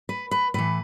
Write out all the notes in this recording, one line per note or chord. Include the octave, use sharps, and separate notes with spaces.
B4
B4
A2 E3 B4